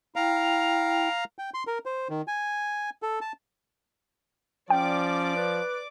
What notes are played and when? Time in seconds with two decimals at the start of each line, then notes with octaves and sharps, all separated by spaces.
0.16 E4 F5 G5 A#5
1.39 G5
1.54 C6
1.67 A#4
1.86 C5
2.10 D#3
2.28 G#5
3.02 A4
3.21 A5
4.70 F3 C#4 D5 G5 D6
5.36 B4